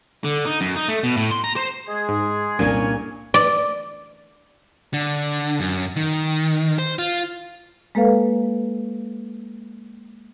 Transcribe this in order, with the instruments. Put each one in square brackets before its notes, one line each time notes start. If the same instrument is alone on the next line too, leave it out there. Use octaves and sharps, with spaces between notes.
[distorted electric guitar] D3
D#4
F#2
D#4
A3
B2
A2
C6
A#5
C5
[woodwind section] G#3 G#4
[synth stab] G#2
[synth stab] C2 D4 G#5 [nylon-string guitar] A#2 A#3 [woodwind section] C#4 C#5
[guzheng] D5
[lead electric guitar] D3
F#2
D#3
C5
F4
[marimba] G#3 A#3 A4 B4 F5